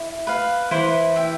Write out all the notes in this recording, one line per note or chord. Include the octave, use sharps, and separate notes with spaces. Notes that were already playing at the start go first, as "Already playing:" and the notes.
Already playing: E4
B4 F5
E3 E4 C5
E5 G5